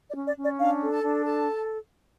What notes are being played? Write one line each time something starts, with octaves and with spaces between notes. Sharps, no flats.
D5
C#4
D5
C#4
D5
D4 F5
A4
A5
D4
A4 A5